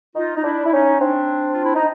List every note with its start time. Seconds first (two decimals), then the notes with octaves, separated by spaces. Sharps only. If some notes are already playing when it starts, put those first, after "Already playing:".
0.15 D#4 F4
0.37 D#4
0.44 D4 E4
0.65 E4
0.73 C#4 D#4
1.00 C4 D4
1.52 F4
1.63 E4
1.75 D#4